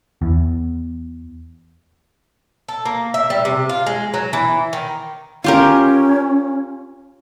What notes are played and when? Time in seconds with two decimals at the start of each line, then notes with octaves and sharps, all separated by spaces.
0.22 E2
2.68 A4
2.85 A#3
3.14 E5
3.30 G3
3.45 C3
3.69 F4
3.86 G#3
4.14 F#3
4.33 E3
4.73 D#3
5.44 C#4 F4 G4 A#4